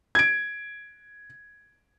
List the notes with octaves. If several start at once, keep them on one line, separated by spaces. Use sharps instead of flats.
G#6 D7